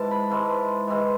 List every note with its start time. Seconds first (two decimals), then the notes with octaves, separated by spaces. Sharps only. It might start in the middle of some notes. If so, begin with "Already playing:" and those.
Already playing: G#2 E3 G#3 A5
0.11 B5
0.30 G#2 E3 G#3 A5
0.87 G#2 E3 G#3